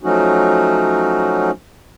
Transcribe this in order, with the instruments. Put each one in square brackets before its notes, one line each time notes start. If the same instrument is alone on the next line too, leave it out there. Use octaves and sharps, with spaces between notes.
[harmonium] F3 F#3 A3 C#4 D#4 F#4